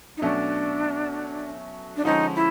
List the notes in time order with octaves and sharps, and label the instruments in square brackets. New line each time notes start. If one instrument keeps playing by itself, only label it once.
[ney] D#4
[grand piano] B2 F#3 A3 C#4 [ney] D4
[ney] D4
[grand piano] D3 F3 G#3 C#4 [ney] D#4
[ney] E4